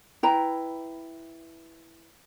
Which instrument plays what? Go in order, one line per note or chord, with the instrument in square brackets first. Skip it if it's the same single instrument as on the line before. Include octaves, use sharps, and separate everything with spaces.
[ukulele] E4 B4 G5 A#5